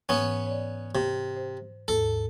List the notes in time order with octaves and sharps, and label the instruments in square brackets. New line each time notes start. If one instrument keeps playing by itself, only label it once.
[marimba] G#2 E3 [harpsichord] B3 C#4
[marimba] C#5 D5
[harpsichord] C3
[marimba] C5
[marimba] D#2 G#2 [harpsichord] A4